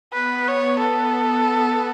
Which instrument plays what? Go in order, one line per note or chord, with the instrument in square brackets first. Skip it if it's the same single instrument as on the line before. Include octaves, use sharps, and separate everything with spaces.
[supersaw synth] B3 [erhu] B4
[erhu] C#5
A4